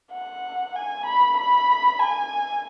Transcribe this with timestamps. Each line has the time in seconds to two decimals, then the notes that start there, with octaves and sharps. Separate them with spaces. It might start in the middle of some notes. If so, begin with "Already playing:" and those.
0.13 F#5
0.76 G#5
1.06 B5
1.37 B5
2.00 G#5